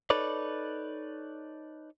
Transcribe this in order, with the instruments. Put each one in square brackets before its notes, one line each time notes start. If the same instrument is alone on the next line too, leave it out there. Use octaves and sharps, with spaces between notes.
[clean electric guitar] D#4 A4 B4 C#5 D5